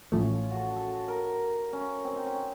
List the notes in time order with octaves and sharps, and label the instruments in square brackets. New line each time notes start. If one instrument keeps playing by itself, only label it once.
[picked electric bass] A1 A2 F3 A3 [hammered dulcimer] C#4
[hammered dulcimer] F4
F#4 A4
F#4
A4
A#4
C#4
C4
D#4
C#4